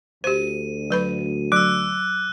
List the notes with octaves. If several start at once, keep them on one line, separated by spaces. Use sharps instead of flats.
D2 G4 C5 D#7
F#3 B4 B5
F#3 D6 E6 F#6